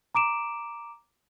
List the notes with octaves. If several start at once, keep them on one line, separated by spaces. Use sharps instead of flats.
A#5 D6 D7 E7